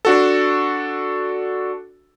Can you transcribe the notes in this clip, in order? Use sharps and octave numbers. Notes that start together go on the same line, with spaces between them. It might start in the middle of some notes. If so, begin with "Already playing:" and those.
D4 F#4 A4